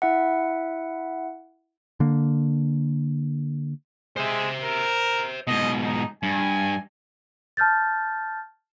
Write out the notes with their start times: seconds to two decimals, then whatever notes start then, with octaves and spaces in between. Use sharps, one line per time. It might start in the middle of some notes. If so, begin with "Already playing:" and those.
0.02 E4 E5 F#5
2.00 D3 A#3
4.16 G#3 C5 E5
4.63 A#4
5.47 G#2 B2 D#5
5.84 D#4
6.23 G2 G#5
7.57 A5 F6 G6 A6